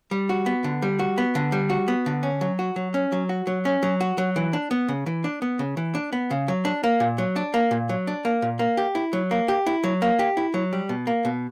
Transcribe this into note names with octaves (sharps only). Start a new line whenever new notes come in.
G3
F#4
B3
D3
G3
F#4
B3
D3
G3
F#4
B3
D3
C#4
F#3
F#4
F#3
C#4
F#3
F#4
F#3
C#4
F#3
F#4
F#3
E3
D4
B3
C#3
E3
D4
B3
C#3
E3
D4
B3
C#3
F#3
D4
A#3
A#2
F#3
D4
A#3
A#2
F#3
D4
A#3
A#2
A#3
G4
E4
F#3
A#3
G4
E4
F#3
A#3
G4
E4
F#3
G3
B2
A#3
B2